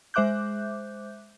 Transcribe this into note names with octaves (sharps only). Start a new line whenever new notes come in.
G#3 C5 E5 D6 F#6 G6